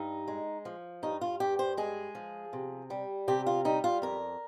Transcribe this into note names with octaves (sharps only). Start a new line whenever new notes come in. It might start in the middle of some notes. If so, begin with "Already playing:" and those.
Already playing: G2 D#4
G#3
F3
G2 D#4
F4
G2 G4
C5
G#3 G#4
F3
C3
G3
C3 G4
F4
G3 D#4
F4
F2 A#4